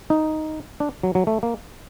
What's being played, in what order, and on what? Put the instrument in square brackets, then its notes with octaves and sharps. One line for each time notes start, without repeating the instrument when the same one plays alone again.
[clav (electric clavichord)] D#4
D4
F#3
F#3
A3
A#3